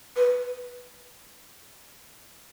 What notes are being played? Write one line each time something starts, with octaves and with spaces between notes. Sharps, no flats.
B4